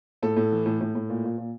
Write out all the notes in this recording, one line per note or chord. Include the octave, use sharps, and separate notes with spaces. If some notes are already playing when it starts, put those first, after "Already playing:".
A2 A4
A2
E3
A2
A2
A2
A#2
A#2
A#2